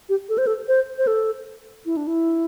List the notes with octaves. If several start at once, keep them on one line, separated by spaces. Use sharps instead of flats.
G4
A4
C5
A4
C5
C5
A4
E4
D4
E4